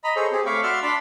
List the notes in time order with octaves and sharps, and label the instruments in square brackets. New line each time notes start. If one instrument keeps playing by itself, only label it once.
[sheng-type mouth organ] D#5 A#5 B5
G#4 A4 C5 C#5 D#5
C4 G4 G#4
A3 C#5 F5 B5 C#6 D6
F#4 D5 E5 C6 E6 F6
D4 D5 A5 B5 C6